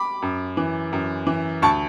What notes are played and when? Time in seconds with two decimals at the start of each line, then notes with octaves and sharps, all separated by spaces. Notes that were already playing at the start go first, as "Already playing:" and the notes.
Already playing: B5 D6
0.22 F#2
0.57 E3
0.93 F#2
1.27 E3
1.62 D2 A5 C#6